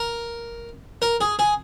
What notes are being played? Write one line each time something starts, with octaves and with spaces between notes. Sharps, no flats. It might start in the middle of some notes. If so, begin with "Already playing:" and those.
Already playing: A#4
A#4
G#4
G#4